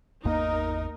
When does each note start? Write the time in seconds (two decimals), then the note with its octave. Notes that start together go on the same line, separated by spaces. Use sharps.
0.25 G#1 E2 A#3 D#4 A#4 D#5